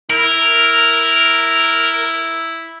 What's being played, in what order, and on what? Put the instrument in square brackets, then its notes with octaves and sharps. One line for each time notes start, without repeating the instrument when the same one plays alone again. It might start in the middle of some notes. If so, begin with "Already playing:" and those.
[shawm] E4 [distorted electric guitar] A#4